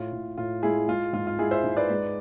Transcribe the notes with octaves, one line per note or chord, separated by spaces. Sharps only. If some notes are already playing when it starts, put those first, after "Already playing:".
Already playing: A2 F4
A2
A2 F4
G#3 E4 G#4
G#3 F4
G#2 F4
F4
G#3 E4 G#4
C5 E5
G#2
B4 D5
G#3